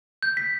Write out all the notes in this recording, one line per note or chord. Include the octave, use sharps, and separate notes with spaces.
G6
B6